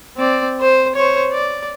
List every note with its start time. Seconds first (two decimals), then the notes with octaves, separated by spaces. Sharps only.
0.17 C4 D5
0.61 C5
0.95 C5 C#5
1.32 D5